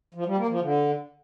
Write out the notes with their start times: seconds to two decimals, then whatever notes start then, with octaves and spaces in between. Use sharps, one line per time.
0.14 F3
0.26 G3
0.37 A#3
0.49 F3
0.60 D3